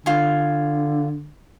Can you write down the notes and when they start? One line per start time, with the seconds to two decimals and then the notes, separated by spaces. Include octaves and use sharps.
0.06 D3 F4 G#5